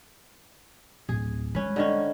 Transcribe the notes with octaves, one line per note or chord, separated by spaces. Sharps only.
D1 A1 G#4
G3 G#3 C#4 B4
D3 D#3 C#4